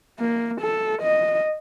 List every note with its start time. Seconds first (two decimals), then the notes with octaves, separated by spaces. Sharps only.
0.19 A#3
0.61 A4
1.02 D#5